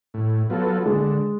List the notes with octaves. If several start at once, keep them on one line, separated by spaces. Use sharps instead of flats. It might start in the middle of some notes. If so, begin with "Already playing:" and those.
A2
F#3 B3 F4 A4
D3 G#3